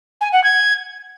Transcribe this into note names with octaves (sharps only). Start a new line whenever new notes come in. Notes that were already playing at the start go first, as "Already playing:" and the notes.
G#5
F#5
G#6